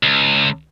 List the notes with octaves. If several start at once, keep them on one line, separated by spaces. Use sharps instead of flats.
C#2